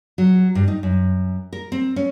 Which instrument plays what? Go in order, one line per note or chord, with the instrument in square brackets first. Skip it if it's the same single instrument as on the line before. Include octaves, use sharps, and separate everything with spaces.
[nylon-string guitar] F#3
G2
D#4
F#2
A#4
C4
C#4